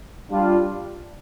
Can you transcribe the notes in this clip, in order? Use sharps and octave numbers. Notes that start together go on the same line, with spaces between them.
G3 D4 F4